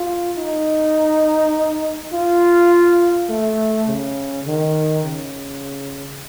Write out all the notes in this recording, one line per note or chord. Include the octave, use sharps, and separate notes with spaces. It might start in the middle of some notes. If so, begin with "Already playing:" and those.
Already playing: F4
D#4
F4
A3
C#3
D#3
C#3